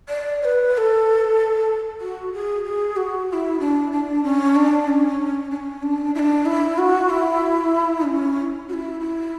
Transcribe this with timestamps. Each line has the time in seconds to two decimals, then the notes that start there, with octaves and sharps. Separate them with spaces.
0.09 D5
0.41 C#5
0.44 B4
0.73 B4
0.77 A4
2.00 F#4
2.32 G#4
2.64 G#4
2.96 F#4
3.28 F#4
3.33 E4
3.60 D4
3.92 D4
4.23 C#4
4.55 D4
4.87 C#4
5.51 D4
5.56 C#4
5.82 D4
6.15 E4
6.19 D4
6.45 E4
6.78 F#4
7.09 E4
8.05 C#4
8.69 F#4
8.73 E4
9.00 E4